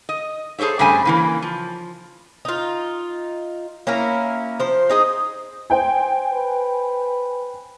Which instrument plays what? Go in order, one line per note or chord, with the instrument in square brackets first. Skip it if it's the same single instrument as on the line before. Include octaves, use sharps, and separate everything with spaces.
[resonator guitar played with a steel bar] D#5
G#4 A4 C5 C#5 E5
G2 C#3 G3 A3 C5 G#5
C#3 E3 A#3
F3
[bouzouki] D#4 F4
A#3 C#4 E4 A#4
F3 C5
D#4 G#4 D#5
[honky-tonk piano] C5 G5 G#5
[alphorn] B4